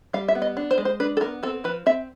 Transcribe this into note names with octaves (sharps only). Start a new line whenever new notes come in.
G3 F5
E5
B3
D#5
D4
C5
G#3
C5
D4 B4
A4
B3 A#4
C4 A4
F3 B4
C4 E5